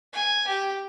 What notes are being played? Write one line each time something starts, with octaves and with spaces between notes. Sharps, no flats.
G#5
G4